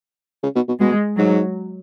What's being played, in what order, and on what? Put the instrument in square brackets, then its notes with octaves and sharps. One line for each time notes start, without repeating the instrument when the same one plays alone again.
[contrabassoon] C#3
B2
B2
[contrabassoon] B2 [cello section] G#3
[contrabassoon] G#2 [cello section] F#3